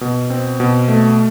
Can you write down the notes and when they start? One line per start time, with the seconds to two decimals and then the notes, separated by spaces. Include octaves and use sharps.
0.01 B2
0.30 C4
0.60 B2
0.88 A3